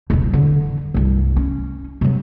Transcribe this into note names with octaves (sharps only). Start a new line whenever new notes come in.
E1 C2
D3 E3
C2 G2
C#4
C3 F#3